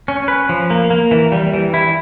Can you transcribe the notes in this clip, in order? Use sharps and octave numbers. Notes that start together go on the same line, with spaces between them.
C#4
B4
F3
A#3
A#3
E3
G3
E3
E4